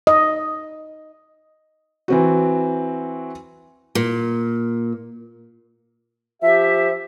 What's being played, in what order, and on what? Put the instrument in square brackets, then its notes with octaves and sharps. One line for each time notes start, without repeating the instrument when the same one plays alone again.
[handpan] D#5
[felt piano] E3 C4 F#4
[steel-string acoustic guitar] A#2
[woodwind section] F3 G4 E5